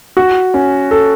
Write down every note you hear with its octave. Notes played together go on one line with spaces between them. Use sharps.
F#4
C#4
A4